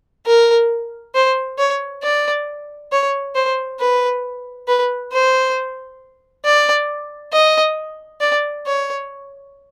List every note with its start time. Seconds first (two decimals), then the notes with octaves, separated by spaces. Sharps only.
0.26 A#4
1.15 C5
1.59 C#5
2.03 D5
2.92 C#5
3.35 C5
3.80 B4
4.68 B4
5.12 C5
6.45 D5
7.33 D#5
8.21 D5
8.66 C#5